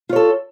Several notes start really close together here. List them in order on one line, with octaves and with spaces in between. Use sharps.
F4 C#5 A4